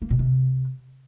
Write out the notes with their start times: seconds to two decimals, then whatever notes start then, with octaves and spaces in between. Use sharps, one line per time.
0.02 A#3
0.10 B2
0.19 C3